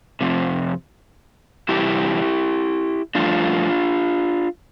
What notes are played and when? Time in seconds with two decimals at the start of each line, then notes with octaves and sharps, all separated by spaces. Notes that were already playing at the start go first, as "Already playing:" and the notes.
0.21 F2 C3
1.69 E2 C3 G3 E4 G4
3.15 G2 F3 A3 D4 F4